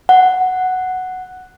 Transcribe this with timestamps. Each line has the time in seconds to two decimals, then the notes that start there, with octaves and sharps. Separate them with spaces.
0.09 F#5